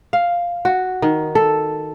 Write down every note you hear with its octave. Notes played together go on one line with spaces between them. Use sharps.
F5
F#4
D#3
A4